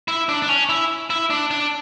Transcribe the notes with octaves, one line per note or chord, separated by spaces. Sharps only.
E4
D4
D4
C#4
E4
E4
D4
D4